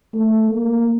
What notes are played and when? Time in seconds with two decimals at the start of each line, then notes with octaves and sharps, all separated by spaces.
0.14 A3
0.50 A#3